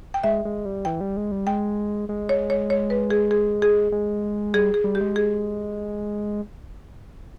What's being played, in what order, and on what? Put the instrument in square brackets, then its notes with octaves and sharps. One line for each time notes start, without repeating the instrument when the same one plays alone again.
[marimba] G5
[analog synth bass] G#3 [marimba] E5
[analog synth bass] G#3
G3
[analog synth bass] E3 [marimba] G5
[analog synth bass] G3
G#3
G3
[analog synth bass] G#3 [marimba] G5
[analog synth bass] G#3
[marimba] C#5
C#5
C#5
B4
G#4
G#4
G#4
[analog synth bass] G#3
[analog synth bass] G3 [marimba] G#4
[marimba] G#4
[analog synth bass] G3
[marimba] G4
[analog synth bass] G#3
[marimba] G#4